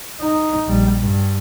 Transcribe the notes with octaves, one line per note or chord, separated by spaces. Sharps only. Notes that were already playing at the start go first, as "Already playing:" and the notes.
D#4
A#1 G3
G2